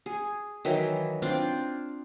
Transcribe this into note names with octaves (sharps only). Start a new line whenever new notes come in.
G#4
D#3 E3 F#3 E4
C4 D4 F4 D5